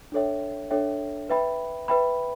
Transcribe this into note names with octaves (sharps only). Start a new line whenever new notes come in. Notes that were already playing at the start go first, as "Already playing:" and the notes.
D4 A4 C#5 E5 G5
D4 A4 C#5 E5 G5
B4 E5 G5 B5
B4 E5 G5 B5